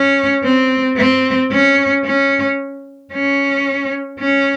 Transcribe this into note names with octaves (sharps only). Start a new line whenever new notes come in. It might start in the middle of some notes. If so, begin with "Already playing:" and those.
Already playing: C#4
C4
C4
C#4
C#4
C#4
C#4